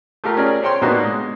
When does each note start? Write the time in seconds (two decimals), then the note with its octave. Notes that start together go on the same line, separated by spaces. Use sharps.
0.24 A3 F4 G4 A#4
0.37 C#4 G#4 A#4 D5
0.63 C5 C#5 G5 A#5 C6
0.81 B2 A#3 B3 D4 D#4 F#4
1.04 G#3